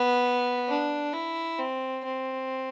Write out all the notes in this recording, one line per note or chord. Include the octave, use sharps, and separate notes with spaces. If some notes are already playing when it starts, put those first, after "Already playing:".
Already playing: B3
D4
E4
C4
C4